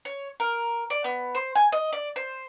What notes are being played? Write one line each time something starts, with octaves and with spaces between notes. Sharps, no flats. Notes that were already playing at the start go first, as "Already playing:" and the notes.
C#5
A#4
D5
B3
C5
G#5
D#5
D5
C5